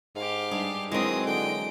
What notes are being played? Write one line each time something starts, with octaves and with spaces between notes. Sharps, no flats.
G#2 G4 F5
G2 G#4
D#3 E3 F#3 G#3 C4 D#6
D3 G5